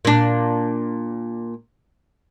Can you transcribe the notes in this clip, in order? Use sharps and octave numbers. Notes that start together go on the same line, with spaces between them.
A#2 D4